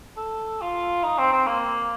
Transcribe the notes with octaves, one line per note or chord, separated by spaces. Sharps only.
A4
F4
D#4
C4
C4
A#3